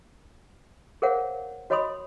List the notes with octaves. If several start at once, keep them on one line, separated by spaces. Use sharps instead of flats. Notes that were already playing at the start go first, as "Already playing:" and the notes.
G#4 A#4 C5 C#5 F5 F#5
F#4 C#5 D#5 B5 C6 D#6